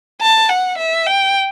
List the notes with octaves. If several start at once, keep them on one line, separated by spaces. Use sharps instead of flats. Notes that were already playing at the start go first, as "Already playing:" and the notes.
A5
F#5
E5
G5